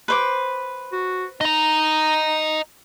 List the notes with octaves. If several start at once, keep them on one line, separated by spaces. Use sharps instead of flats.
B4 C5 D6
F#4
D#4 D#5 A#5